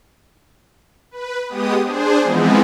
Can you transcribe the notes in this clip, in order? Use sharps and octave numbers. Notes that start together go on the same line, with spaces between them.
B4
G#3 B3 G4 D#6
D4 G#4 C5
E3 F3 G#3 B3 C4